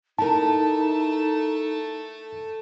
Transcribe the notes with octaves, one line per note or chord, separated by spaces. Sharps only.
A3 D#4 E4 A4 A#4 A5